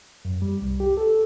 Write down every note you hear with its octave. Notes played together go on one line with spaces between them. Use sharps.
F#2
G3
C2
G4
A4